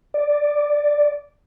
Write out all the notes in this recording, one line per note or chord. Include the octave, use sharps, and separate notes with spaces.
D5